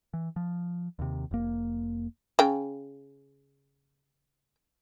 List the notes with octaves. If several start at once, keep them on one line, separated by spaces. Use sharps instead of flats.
E3
F3
D#2 C3
F1 A#3
C#3 G5